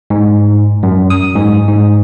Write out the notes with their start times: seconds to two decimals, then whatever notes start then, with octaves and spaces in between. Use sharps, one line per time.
0.10 G#2
0.83 F#2
1.10 D#6
1.35 G#2
1.68 G#2